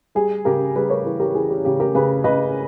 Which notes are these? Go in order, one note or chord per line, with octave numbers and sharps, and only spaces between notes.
G3 G#4
C#3 G4 A#4
G3 G#4 B4
A#4 C#5
E3 G#4 B4
G4 A#4
E3 G#4
G4
C#3 G4
G4 A#4
C#3 G#4 B4
C#3 B4 D#5